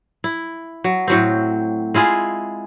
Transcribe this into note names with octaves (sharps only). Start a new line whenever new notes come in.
E4
F#3
A2 F#3 C4
G#3 E4 F4 G#4